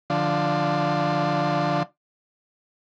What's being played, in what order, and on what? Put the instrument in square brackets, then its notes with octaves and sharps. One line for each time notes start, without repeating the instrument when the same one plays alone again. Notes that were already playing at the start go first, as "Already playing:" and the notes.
[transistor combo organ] D3 F3